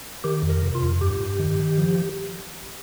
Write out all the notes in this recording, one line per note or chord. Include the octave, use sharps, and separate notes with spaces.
D#3 G4
F2
A#4
C3
F4
F2
G2 G4
G2
D#3
D#3
F3